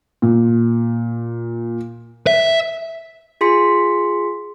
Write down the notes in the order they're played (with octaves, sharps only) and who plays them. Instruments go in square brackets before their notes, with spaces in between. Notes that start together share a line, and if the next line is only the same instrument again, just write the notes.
[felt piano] A#2
[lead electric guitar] E5
[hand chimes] F4 G#4 C6 B6 C#7